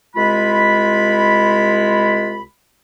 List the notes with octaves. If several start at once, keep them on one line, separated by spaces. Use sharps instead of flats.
C2 G#3 F4 B5